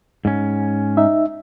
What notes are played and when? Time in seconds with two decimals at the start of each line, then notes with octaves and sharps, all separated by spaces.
0.25 G#2 C#4
0.97 D#4 E5